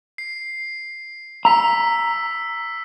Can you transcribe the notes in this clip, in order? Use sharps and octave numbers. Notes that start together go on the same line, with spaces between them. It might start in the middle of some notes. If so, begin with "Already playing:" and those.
C7
A#5 E6 B6